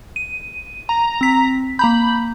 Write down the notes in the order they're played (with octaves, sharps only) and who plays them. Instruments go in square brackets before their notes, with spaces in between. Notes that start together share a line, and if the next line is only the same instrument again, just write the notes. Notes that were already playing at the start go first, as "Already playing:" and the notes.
[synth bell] D#7
[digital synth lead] A#5
[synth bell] C4 B6
[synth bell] A#3 A#5 G6 [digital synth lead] B5